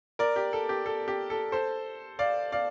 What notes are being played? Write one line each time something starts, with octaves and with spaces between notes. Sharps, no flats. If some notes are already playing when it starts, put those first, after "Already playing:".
A#4 D5
G4
A4
G4
A4
G4
A4
A4 C5
D5 F5
D5 F5